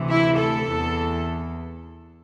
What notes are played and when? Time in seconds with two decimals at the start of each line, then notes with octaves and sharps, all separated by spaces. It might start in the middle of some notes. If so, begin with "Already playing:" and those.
Already playing: D2 C3 E3
0.09 E4
0.38 A4
0.66 E2 E3